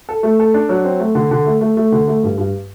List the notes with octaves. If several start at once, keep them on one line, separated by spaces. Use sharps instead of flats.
A4
A3
A4
D4
F#3
C4
A3
D3
D3
A3
A3
A3
D3
A3
G2
G2